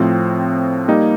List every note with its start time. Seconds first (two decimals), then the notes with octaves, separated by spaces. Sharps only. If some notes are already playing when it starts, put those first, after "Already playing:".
Already playing: A2 F3 C4
0.88 G3 A#3 D#4